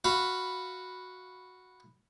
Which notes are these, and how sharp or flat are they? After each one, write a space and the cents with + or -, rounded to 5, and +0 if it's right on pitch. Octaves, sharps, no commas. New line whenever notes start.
F#4 -5 F5 -15 B5 +0